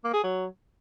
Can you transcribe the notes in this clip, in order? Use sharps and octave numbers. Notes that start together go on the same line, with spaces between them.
A#3
G#4
F#3